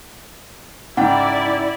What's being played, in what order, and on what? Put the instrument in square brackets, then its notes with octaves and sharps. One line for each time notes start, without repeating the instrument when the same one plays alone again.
[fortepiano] G#2 C#3 G5 [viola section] E4 D5 [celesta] F#5